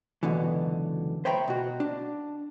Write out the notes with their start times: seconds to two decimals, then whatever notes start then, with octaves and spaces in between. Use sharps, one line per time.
0.23 C#2 F#2 B2 D3 E3
1.25 C5 C#5 E5 G5 A#5 B5
1.48 B2 F#4
1.80 D4